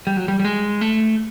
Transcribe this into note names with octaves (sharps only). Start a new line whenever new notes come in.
G3
F#3
G3
G3
G#3
A3